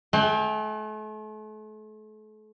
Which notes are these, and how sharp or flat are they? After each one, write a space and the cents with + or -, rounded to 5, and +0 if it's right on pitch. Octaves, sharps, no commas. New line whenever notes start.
A3 -40 G5 +30